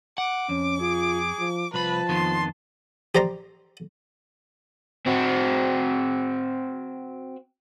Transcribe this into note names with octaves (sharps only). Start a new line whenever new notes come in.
F#5 D6
F2 C#4
F4 G#4
F3
C2 F3 B4 A5 B5
F2 D#3 B3 C6
G4 C5 D5 A#5 C6
C4 F#4